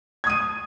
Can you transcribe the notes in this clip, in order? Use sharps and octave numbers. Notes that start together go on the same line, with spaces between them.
D#6 G#6 D#7